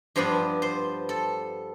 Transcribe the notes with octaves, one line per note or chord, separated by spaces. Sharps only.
G2 F3 B3 D4 C5
C5
A4